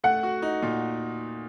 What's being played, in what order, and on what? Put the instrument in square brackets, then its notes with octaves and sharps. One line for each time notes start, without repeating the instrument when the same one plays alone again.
[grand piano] A3 [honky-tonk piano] F#5
[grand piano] F#4
D#4
A#2